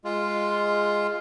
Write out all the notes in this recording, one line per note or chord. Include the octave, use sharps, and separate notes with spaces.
G#3 F4